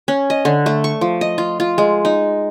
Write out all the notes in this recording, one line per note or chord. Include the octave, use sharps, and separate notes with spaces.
C#4
D#5
D3
A3
C#6
F3
D#5
F4
F4
G#3
D#4